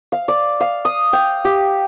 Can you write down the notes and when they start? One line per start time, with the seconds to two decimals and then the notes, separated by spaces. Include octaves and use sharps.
0.12 F5
0.28 D5
0.60 F5
0.85 D#6
1.13 G5
1.45 G4